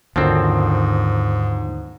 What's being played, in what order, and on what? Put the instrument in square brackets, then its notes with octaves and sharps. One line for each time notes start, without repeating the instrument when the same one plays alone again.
[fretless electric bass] D#2 D3 D#3 [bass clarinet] G#2 [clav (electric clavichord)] F3 F#3 C4